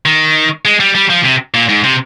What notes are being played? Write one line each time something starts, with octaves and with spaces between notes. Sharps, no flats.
D#3
G#3
G3
G3
F3
C3
A#2
G#2
C3